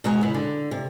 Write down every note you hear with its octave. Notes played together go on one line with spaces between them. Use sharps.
B2 G#3 F#4 A#5
C#3 E4
D3
C3